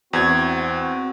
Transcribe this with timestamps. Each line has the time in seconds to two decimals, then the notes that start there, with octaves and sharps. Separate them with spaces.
0.13 E2 C4 F#4 G#6